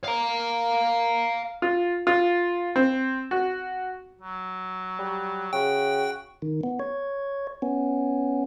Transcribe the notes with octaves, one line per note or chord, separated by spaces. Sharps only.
F5 A#5
F4
F4
C4
F#4
F#3
G3
C#3 F#4 G5
D#3
B3
C#5
B3 C#4